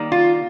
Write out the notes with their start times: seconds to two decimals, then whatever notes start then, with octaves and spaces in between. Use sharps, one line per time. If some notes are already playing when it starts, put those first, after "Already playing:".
Already playing: D#3 G3 A#3
0.12 F4